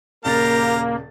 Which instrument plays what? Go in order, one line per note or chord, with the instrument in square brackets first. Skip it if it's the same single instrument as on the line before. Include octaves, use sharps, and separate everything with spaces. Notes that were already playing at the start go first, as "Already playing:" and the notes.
[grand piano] D#1 C#3 A6 [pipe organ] A#3 [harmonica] G4 F5 A#5 [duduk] A#4